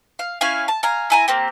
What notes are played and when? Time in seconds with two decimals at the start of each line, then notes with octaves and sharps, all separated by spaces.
0.19 F5
0.41 C#4 E4 F5 G#5
0.68 A5
0.83 F5 G#5 A#5
1.10 E4 G#5 A#5
1.28 A#3 C4 G4